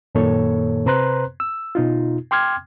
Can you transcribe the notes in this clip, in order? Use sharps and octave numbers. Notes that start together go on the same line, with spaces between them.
F#2 A#2 D#3 A#3 A4 C#5
C3 B4 C5 A#5 C6 F#6
E6
B2 D#4 F4
G5 C6 D6 F6 G#6